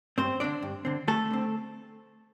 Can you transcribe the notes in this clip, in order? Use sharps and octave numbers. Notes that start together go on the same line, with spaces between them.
G2 C4 C5
D3 C4 D4 D5
G2
D3 C4
D2 A3 A4
D3 C4